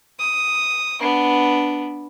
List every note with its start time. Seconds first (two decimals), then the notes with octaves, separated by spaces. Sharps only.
0.20 D#6
1.00 B3 D4